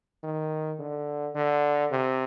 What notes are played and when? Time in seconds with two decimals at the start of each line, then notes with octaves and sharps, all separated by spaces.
0.23 D#3
0.80 D3
1.35 D3
1.91 C3